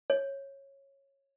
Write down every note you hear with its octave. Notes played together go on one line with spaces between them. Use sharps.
C#5